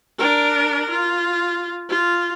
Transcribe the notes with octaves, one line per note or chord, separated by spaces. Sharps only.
D4 A#4
F4
F4